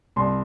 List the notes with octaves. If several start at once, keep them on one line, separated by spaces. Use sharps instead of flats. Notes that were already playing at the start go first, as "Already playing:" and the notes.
C2 C6